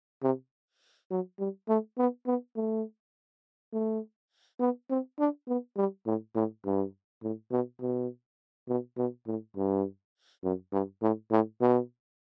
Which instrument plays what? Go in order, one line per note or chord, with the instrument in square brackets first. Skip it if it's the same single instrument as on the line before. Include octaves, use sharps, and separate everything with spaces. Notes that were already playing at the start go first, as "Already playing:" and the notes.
[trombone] C3
F#3
G3
A3
B3
B3
A3
A3
B3
C4
D4
B3
G3
A2
A2
G2
A2
B2
B2
B2
B2
A2
G2
F#2
G2
A2
A2
B2